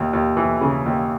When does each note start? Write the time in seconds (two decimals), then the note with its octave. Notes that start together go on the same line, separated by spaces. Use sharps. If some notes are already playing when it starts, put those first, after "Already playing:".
Already playing: D#2
0.13 D#2
0.37 E3
0.61 C#3
0.86 D#2